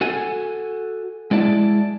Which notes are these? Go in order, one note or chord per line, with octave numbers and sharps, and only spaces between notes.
F#4 A4 G#5
G#3 E4 D5 A5